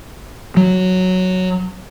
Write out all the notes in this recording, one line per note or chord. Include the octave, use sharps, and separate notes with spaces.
F#3